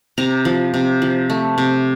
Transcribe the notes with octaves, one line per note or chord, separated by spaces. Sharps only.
C3 A#5
F3
C3
F3
A3
C3